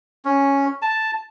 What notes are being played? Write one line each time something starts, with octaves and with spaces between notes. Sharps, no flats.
C#4
A5